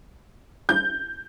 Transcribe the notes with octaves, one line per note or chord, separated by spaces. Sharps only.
G6